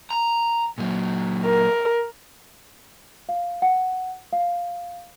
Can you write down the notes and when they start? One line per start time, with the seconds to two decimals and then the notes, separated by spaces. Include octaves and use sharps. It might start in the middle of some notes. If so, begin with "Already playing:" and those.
0.10 A#5
0.78 A#2 F#3
1.46 A#4
3.29 F5
3.62 F#5
4.33 F5